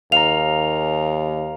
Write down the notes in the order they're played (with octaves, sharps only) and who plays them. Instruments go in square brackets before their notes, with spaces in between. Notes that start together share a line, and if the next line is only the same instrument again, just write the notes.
[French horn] D#2 [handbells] F5 A#5 [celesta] F7